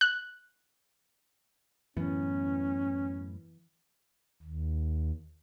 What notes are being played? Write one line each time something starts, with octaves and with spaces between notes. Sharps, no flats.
F#6
F#2 A2 E3 B3 C#4
D#2